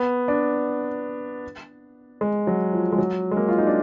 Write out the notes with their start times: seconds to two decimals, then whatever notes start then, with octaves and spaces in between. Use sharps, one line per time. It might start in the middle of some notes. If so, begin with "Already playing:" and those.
Already playing: B3
0.28 D4
2.21 G#3
2.47 F#3
2.73 F3
2.92 G#3
2.98 F#3
3.31 G#3
3.37 A#3
3.48 F4
3.58 D#4
3.67 D4